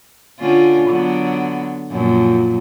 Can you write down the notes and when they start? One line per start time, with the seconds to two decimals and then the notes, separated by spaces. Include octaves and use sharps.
0.39 D3 C#4 F4
0.89 D3 F#3 B3
1.91 F#2 A#2 F3